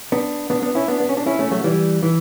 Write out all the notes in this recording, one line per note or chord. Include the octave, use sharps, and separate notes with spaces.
B3 D4
B3 D4
B3 D4
C#4 E4
B3 D4
B3
C#4
D4
C#4 E4
A3 C#4
F#3 A3
E3 G3
E3